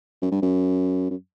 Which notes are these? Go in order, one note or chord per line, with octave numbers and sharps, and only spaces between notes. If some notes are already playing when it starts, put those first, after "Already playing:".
F#2
G2
F#2
F#2